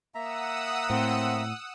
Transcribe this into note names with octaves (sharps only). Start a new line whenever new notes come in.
A#3 E5 F#5 A#5 D#6 E6
A2 C4